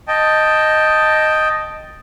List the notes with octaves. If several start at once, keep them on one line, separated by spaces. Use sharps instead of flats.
D#5 G5 A5